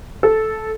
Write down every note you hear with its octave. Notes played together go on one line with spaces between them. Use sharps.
A4